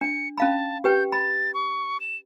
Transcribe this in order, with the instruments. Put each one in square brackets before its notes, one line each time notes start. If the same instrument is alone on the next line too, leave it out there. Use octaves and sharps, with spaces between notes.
[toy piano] D4 [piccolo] C#7
[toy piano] C#4 F5 B5 [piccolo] A5
[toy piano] G4 B4 G5 [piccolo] G6
[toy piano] B5 [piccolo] A6
[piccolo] C#6
E7